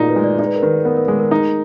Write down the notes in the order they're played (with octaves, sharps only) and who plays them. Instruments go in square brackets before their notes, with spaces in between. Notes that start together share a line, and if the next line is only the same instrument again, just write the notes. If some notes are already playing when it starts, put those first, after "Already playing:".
Already playing: [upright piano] A#2 D#4 [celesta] F#4 G#4 A#4 D5
[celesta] B4
[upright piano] G#3
[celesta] D5
[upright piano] D#4 [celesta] D5
[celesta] B4
A#4
[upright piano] D#3 [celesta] B4
[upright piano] B3 [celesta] A#4
[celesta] A#4
[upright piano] G#3 [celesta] G#4
[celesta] A#4
[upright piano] D#4